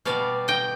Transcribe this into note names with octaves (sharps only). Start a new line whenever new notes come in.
B2 G3 D5 F5
D#5 G5